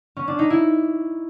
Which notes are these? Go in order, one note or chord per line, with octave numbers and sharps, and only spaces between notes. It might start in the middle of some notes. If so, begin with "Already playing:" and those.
C#4
D4
D#4
E4